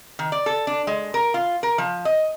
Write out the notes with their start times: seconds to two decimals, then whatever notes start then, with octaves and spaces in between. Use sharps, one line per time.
0.19 D#3
0.32 D5
0.46 A4
0.67 D4
0.87 G#3
1.14 A#4
1.34 F4
1.63 A#4
1.78 F3
2.05 D#5